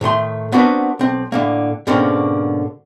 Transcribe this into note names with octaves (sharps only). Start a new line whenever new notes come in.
A2 D#3 A3 C6
B3 C4 D4 F#4 A#4 B4
B1 C4
A2 D3 A#3
G#2 B2 D3 A#3 C4 C#4